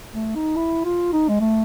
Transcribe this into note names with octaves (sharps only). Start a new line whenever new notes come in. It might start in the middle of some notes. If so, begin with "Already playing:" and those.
A3
D#4
E4
F4
D#4
G#3
A3